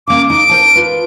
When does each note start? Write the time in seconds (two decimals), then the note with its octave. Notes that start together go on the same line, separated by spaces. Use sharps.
0.08 C#3 A#3 D6
0.30 D#4 D7
0.49 A#4 C5 A5
0.75 F4 B4